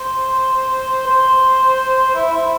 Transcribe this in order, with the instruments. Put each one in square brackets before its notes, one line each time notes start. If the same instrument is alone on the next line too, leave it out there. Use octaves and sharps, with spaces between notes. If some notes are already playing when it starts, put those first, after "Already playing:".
Already playing: [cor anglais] C5
C5
E4
E4